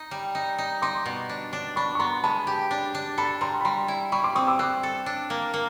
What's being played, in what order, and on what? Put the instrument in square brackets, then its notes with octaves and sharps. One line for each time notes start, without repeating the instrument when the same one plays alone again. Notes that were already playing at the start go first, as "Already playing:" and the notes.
Already playing: [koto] D#4
G3
D#4
D#4
[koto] D#4 [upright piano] C6 D6
[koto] B2
D4
D4
[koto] D4 [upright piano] B5 C#6
[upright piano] C#6
[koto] B3 [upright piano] A#5 C6
[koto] G#3 [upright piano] A5 B5
[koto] G4
D4
D4
[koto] A4 [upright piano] A5 B5
[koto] G3 [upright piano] A#5 C6
[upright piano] B5
[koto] G3 [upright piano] A#5 C6
[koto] E4
[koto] G3 [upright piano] B5 C#6
[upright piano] C6 D6
[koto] C4 [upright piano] C#6 D#6
[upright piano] D6 E6
[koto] C4 [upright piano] E6 F#6
[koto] A4
D4
A#3
A#3